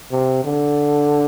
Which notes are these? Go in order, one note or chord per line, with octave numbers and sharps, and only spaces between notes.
C3
D3